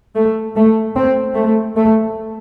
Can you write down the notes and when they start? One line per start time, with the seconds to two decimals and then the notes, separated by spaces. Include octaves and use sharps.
0.15 A3
0.56 A3
0.95 C4
1.35 A3
1.75 A3